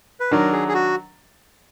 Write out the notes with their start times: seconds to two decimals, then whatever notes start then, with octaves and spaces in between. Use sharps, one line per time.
0.20 B4
0.31 D#3 F#3 D4 A#4
0.52 G#4
0.68 G#4
0.74 F#4